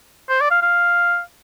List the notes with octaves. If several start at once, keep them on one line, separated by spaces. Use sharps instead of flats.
C5
D5
F5
F5